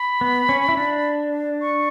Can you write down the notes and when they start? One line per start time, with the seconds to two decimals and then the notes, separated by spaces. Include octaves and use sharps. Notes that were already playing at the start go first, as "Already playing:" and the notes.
Already playing: B5
0.21 B3
0.49 C#4
0.69 E4
0.77 D4
1.61 C#6